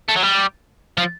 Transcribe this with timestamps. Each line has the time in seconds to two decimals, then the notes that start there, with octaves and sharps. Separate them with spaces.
0.09 A3
0.16 F#3
0.23 G3
0.98 F3